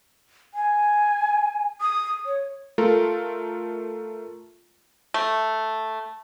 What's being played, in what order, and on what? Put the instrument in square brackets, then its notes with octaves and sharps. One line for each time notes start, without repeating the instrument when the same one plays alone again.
[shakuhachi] G#5
D#6
C#5
[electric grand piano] A3 F4 A4 A#4
[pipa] A3